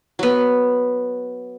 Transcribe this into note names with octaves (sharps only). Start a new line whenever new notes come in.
F#3 B3